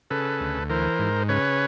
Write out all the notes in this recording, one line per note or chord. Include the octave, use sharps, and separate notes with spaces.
C#3 A4 B4
D2
E3 A#4 C5
G#2
C#3 B4 C#5